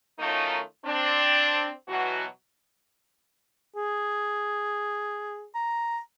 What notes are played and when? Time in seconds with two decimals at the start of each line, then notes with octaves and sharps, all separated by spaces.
0.19 D#3 F#3 A3 C#4 D#4 F4
0.85 C4 D4
1.88 B2 E3 F#3 F#4
3.76 G#4
5.55 A#5